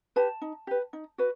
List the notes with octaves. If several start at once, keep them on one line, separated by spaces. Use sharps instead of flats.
G4 B4 A5
D#4
G4 B4
D#4
F#4 B4